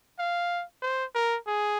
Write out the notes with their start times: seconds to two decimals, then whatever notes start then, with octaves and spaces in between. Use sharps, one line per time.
0.19 F5
0.82 C5
1.14 A#4
1.47 G#4